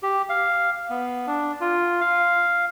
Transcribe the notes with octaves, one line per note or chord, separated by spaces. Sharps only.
G4
F5
B3
D4
F4
F5